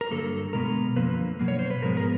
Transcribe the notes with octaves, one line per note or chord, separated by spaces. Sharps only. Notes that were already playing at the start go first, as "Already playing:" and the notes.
A#4
G2 D3 F#3 A#3 A4
B2 G#3 B3 A#4
F#2 D3 F3 A#3 B4
B2 F#3 A#3
C#5
C5
B4
G#2 F3 G#3 B3 A#4
A#4